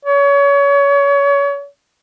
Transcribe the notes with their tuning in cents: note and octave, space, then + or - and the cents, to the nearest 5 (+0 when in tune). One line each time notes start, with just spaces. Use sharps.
C#5 +30